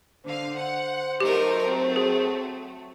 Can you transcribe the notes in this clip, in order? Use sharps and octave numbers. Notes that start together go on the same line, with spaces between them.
D3 C5 F5
F#5
F#3 A3 D#4 G4 A#4
C4
G#4